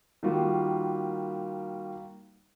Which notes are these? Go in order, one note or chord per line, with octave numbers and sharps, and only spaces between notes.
D#3 G3 A#3 F4 F#4